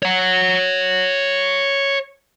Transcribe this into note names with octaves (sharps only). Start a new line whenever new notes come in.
C#5 F#5